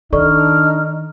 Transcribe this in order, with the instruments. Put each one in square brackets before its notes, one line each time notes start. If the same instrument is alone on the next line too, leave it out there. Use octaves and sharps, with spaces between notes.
[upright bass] D#3 [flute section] D4 F6 [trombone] D#4 [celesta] A4 D5 C#6